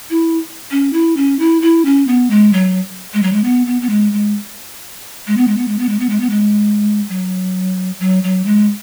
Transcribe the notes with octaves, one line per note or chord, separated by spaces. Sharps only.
E4
C#4
E4
C#4
E4
E4
C#4
B3
G#3
F#3
G#3
F#3
G#3
B3
B3
B3
G#3
G#3
G#3
B3
G#3
B3
G#3
B3
G#3
B3
G#3
B3
G#3
F#3
F#3
F#3
G#3